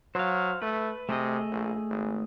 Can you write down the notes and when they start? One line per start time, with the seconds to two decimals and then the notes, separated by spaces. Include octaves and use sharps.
0.15 F#3 C5 F5
0.62 A3 B4
1.09 C3 A3 G#4 D#5
1.51 A#1
1.90 G#1